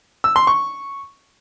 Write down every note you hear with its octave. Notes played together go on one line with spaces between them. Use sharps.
E6
C6
C#6